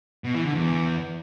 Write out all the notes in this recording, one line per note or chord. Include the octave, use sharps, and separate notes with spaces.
B2
E3
D3
E2